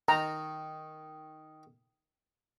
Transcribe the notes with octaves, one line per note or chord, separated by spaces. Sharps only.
D#3 A#5